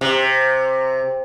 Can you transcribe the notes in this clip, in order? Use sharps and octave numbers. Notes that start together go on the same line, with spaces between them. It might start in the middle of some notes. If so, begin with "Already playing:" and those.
C3